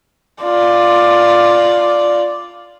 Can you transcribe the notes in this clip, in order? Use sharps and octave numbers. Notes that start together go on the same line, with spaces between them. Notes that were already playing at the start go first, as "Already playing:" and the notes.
F4 D5